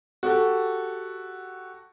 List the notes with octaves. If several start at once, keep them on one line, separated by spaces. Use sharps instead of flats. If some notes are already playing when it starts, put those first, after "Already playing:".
F#4 G4 A4